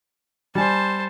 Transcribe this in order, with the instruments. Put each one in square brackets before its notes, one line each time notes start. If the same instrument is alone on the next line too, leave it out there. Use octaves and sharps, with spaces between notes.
[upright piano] G3 G#5 [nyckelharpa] C5 A5